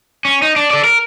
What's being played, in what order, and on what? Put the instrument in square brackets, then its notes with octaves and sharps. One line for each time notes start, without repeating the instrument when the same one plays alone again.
[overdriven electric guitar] C#4
D#4
D4
A4 D5
A#4